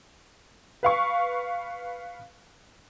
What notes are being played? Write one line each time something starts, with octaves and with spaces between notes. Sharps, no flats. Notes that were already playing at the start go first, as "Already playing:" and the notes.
B4 F5 C#6